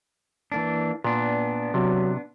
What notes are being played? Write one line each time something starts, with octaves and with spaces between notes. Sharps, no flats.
E3 A#3 D4
A#2 B3 D4
C3 F#3